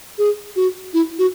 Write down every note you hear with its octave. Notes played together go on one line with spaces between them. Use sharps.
G#4
F#4
E4
F#4